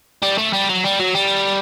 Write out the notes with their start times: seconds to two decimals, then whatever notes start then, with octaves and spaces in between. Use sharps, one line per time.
0.22 G3
0.38 A3
0.53 G3
0.69 F#3
0.84 G3
0.99 F#3
1.14 G3